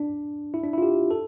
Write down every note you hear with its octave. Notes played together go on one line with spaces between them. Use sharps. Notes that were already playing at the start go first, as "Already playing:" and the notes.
Already playing: D4
E4
D4
E4 F4
G4
A4